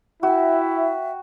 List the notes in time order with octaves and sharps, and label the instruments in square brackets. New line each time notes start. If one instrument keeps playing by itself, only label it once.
[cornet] E4 [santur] F#4 G5 [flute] E5